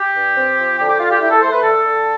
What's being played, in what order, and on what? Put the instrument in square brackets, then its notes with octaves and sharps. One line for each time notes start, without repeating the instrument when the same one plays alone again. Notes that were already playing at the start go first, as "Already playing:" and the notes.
Already playing: [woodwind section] G4
G2
C4
F3
D3 G4
G4
D3 F4
G4
E4 G4
A4
A3 C5
B4
D3 A4
D3